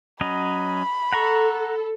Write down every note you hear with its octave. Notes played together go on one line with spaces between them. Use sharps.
F#3 C#4 D#5 B5
A4 F#5 A#5 C#6